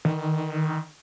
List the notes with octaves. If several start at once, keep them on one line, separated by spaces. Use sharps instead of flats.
D#3